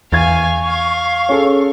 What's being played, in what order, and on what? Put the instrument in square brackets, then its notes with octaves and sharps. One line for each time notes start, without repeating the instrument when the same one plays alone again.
[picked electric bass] E2 [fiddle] F5 G#5 [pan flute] C#6 [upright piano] G#6 A6
[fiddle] F5
[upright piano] C#4 G#4 A4